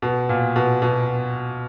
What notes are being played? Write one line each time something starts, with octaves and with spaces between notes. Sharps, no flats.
B2
A#2
B2
B2